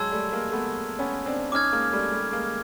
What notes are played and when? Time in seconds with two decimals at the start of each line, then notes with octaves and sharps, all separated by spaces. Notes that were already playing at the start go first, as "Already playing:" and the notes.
Already playing: F#3 G#3 A5 C6 E6 G#6
0.12 G3 A3
0.33 G#3 A#3
0.52 A3 B3
0.99 B3 C#4
1.26 C4 D4
1.52 C#4 D#4 D6 F6 G#6
1.73 G#3 A#3
1.93 G3 A3
2.13 G3 A3
2.33 G#3 A#3